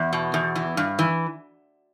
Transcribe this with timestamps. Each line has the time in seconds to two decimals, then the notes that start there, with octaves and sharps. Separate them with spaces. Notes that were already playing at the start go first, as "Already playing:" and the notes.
Already playing: E2
0.13 B2
0.34 E2
0.56 E3
0.77 G2
0.99 E3